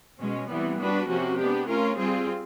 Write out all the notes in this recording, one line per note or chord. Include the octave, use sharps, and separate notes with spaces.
B2 G#3 C#4
C3 E3 G3 B3
G3 B3 D4 F#4 B4
C3 F3 A#3 C#4 F#4
G#3 B3 D4 G4
A3 C#4 F4 A#4
G3 C4 F4 G#4